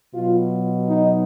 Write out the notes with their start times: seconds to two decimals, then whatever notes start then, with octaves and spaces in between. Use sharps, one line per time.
0.14 B2 F#3 F4
0.89 D#4